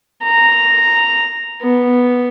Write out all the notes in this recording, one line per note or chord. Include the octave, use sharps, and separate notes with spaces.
A#5
B3